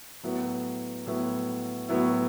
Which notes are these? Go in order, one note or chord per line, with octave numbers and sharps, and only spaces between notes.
A2 F#3 B3 E4
A2 F#3 B3 E4
A2 F#3 B3 E4